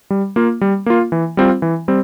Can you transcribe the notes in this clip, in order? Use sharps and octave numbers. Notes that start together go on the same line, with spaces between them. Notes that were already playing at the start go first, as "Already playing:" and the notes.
G3
A#3 F4
G3
A#3 F4
E3
G3 C4 F4
E3
G3 C4